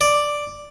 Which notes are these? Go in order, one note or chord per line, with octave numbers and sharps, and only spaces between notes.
D5